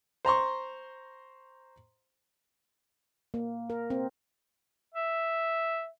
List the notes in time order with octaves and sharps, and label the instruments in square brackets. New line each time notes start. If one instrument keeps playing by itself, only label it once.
[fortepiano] C5 A#5 C6 C#6
[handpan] A#3
A#4
C4
[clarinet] E5